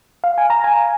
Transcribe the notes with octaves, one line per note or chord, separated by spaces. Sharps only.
F5
G#5
A#5
G#5